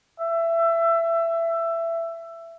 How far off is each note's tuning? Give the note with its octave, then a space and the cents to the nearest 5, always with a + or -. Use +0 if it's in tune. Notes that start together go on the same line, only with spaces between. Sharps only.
E5 +20